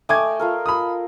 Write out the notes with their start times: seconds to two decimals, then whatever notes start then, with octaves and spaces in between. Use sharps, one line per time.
0.09 A3 D#5 G5 G#5 D6 G#6
0.40 F4 A4 A#4
0.66 B5 D#6